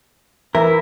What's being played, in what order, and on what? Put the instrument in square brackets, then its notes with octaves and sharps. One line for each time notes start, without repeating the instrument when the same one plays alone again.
[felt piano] E3 [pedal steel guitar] E4 [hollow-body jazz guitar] A#4